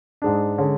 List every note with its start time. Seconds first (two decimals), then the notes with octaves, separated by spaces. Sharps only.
0.22 G#2 G#3 D4
0.58 D3 G#3 C#4